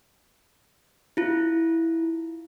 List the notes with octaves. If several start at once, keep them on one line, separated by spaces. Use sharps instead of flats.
E4 F4